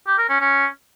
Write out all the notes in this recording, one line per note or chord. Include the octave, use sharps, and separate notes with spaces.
G4
A#4
C#4
C#4